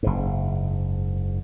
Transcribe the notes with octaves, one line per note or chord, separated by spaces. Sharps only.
F#1 G#2